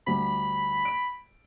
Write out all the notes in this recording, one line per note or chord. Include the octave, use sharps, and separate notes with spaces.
D2 G3 B5
D7